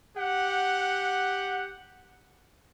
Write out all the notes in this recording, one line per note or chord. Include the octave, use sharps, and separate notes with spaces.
G4 F#5